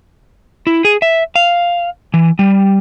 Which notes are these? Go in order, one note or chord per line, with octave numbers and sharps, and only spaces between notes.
E4
G#4
E5
F5
E3
G3